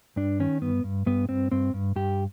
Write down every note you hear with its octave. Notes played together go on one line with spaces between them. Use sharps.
G2 D4
D#3 C#4
G2 B3
G2
G2 B3
G2 C4
G2 C4
G2
G2 G4